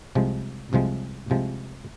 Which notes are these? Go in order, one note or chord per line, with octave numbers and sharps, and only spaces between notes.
C2 C3 F3 G#3
C2 C3 F3 G#3
C2 C3 F3 G#3